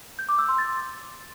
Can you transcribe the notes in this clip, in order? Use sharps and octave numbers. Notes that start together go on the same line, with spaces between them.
G6
D6
E6
C6
A6